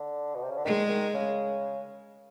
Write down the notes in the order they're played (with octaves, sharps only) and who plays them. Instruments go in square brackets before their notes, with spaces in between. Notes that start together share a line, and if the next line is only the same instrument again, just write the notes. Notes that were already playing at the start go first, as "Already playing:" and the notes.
Already playing: [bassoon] D3
B2
C3
C#3
D3
[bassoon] D#3 [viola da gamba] G#3
[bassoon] D#3
C#3